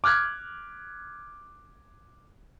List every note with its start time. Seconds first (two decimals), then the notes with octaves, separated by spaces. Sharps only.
0.04 D6 F6 F#6 G#6